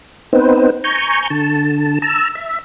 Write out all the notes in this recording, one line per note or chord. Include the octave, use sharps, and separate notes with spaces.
B3 C4 D#4 B4 C5
G#5 A#5 C#6 G6
D3 A5
A5 A#5 E6
E5